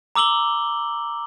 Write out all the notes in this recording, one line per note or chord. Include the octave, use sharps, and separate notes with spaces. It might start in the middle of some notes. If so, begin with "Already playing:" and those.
A#5 D6 E6 F#7 G7